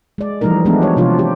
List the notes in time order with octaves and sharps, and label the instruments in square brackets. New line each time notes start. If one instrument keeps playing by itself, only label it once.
[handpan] G#3 D5
E3 F3 G3 A3 D#4 A#4
F3 G#3 A3 B3 D4 G4
F#4 C#5
C3 F3 D4 F4 G4
D4 G4